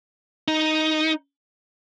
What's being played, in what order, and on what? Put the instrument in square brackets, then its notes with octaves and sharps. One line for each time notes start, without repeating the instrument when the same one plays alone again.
[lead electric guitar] D#4